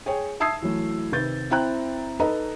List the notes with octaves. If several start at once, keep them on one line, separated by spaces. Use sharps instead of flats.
G#4 C#5 G5
E5 A5 D#6 E6 G#6 C7
E3 F#3 A3
C3 D#3 B4 G6 A6
C4 E4 G5 A#5 F#6
D#4 A4 B4 D#5 A#5